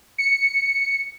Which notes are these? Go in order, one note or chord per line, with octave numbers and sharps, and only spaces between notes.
C#7